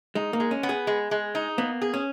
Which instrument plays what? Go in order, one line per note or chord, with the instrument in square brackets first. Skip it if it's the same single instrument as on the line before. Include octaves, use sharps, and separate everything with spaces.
[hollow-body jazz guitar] G#3 [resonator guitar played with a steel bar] D#4
[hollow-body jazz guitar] A#3
[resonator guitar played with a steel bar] G#3
[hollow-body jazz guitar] C#4
[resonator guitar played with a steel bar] B3
[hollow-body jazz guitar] G#4
[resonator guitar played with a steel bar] G#3
G#3
D#4
[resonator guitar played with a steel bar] A#3 [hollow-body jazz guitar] B3
[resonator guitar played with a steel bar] G#4
[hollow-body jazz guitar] C#4